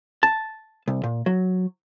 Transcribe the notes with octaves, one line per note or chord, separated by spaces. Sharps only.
A5
C2
A#2
F#3